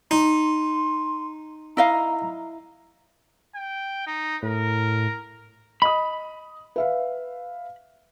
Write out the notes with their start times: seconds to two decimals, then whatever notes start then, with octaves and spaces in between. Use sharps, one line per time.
0.11 D#4 C6
1.77 E4 D#5 F5 A#5
3.55 G5
4.07 D#4
4.43 A2 A#4
5.82 D#5 B5 D#6
6.76 B4 E5 F5